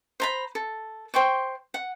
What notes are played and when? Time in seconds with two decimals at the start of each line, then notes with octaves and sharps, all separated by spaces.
0.20 C5 A#5 B5
0.55 A4
1.14 C5 G5 C6 C#6
1.74 F#5